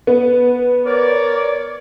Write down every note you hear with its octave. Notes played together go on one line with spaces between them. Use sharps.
B3
A#4 C#5 D5